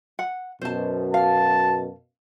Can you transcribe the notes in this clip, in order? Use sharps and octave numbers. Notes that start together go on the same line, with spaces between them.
F#5
F#2 B2 C5 A5
F5 A5